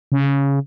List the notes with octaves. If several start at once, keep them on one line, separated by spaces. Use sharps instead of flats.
C#3